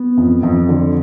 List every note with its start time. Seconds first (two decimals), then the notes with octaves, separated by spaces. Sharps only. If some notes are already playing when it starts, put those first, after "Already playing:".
Already playing: B3
0.17 F2
0.43 F2
0.69 D3